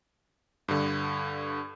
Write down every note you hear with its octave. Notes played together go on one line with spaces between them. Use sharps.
G2 D3